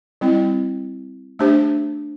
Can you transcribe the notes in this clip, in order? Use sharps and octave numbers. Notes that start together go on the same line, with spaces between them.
G3 C4 E4
A3 D4 G4 C5